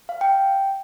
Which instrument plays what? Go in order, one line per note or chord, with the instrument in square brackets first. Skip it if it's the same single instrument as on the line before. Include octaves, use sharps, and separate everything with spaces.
[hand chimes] F5
G5